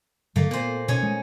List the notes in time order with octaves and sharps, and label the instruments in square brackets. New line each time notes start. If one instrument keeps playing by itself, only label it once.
[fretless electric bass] G2 D3 F#3 [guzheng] A3 A#3
[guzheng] A#2 C5 [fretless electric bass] B3
[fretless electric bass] B2 [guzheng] C#4 D#4 G#5
[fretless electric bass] G#3